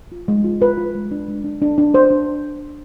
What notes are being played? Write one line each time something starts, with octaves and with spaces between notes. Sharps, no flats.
F4
G#3
F4
F4 B4
F4
G#3
D4
G#3
D4
D4
D4
D4 C5
D4